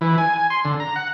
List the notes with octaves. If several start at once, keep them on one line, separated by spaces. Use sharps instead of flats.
E3
G#5
G#5
C6
D3
A#5
F#5